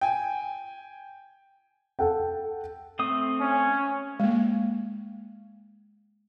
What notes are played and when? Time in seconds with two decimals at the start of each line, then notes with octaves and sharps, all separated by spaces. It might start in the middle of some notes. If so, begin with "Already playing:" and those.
0.01 G5 G#5
1.99 A4 F#5 G5
2.99 A3 C4 D#6
3.40 C#4
4.20 G#3 A#3